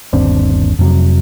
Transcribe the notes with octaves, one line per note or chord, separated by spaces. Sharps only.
G1 D#2 C4 D4
F2 C3 F#3